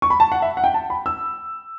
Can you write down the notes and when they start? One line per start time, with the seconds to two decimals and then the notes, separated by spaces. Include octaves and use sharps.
0.02 C#6
0.10 B5
0.20 A5
0.32 F#5
0.42 E5
0.57 F#5
0.64 G5
0.74 A5
0.90 B5
1.06 E6